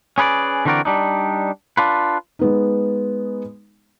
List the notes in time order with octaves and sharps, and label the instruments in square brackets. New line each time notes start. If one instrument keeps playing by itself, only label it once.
[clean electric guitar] C#4 G#4 B4 C#5 D5
D3 E3 C4 F#4 A#4 D5
G3 D4 D#4
D4 F4 B4
[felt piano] G#3 B3 D#4